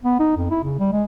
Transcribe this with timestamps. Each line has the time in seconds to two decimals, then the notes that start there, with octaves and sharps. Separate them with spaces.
0.04 B3
0.19 D#4
0.36 F2
0.50 E4
0.64 C#3
0.79 G3
0.92 G#3